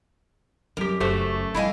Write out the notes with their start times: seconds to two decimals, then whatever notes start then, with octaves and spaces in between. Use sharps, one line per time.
0.77 F#2 G3 C4 G4 A#4
1.00 F#1 A3 F#4 G4 C5
1.55 A2 F3 G3 E4 D#5 F5 G#5